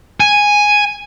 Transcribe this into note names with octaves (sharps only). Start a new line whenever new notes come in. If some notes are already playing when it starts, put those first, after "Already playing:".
G#5